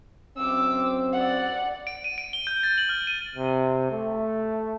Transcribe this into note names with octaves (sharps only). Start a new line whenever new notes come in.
F#1 C4 D6 E6
D5 F#5
D7
D#7
D7
G7
G6
A6
F#7
F6
D#7
C3
A3